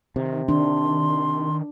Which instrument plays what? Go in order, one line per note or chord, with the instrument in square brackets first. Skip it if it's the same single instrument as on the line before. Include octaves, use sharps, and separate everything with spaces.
[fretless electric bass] C3 [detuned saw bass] D#3
[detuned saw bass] D#3 [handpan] D4 [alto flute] C6